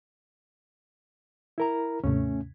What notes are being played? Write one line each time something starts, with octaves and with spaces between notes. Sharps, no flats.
E4 A#4 A#5
D#2 G#2 C3 A3 C#4